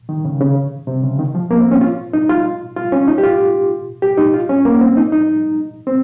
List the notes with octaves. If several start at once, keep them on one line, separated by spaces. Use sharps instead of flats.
D#3
C#3
C#3
C3
C#3
D#3
F3
A#3
C4
C#4
F4
D#4
F4
F4
C#4
D#4
G4
F4
G4
D#4
F4
C#4
A#3
C4
D#4
D#4
C4